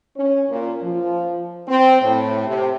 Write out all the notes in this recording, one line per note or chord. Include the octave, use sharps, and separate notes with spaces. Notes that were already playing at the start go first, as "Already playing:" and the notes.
C#4
A#2
F3
C4
A2
C3